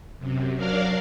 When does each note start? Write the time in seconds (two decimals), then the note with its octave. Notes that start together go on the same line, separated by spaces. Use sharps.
0.18 F#2 C3
0.56 F#3 D4 A#4 D5 F5